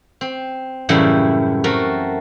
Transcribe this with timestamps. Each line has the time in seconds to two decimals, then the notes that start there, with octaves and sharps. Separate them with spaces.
0.21 C4
0.89 F#2 A2 C#3 E3 G3 E4
1.64 A3 C4 F#4 A#4